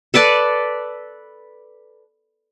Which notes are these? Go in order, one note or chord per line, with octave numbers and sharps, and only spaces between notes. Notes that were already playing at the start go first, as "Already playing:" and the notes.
A4 B4 D5 A5